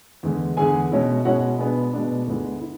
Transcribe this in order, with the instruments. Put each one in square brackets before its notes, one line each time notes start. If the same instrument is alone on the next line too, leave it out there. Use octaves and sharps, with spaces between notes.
[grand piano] E2 D3 G#3
E2 D3 G#3 G#4 G#5
B2 G#3 C#4 E4
B2 G#3 C#4 E4 F#4 F#5
B2 G#3 B3 D4 G#4
B2 G#3 B3 D4
D2 D3 G#3 B3 E4
E4